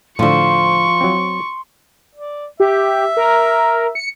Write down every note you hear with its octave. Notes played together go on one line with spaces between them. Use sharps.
A2 D3 F3 C5 C6 C#6
F#3 C4
D5
G4 E5
A#4
C#7